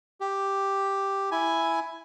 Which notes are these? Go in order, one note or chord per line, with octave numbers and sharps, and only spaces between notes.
G4
E4 G#5